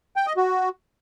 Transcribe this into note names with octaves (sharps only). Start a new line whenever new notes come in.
G5
D#5
F#4